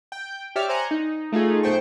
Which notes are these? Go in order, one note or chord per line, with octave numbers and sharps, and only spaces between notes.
G5
G4 C#5 D5 E5 F6
C5 G#5 A#5 F#6 C#7
D#4
A3 D#4 F4 G#4
B1 A3 C5 G5 C#6